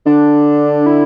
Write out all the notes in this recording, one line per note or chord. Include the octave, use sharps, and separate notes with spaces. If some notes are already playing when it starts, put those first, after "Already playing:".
D3 D4
E4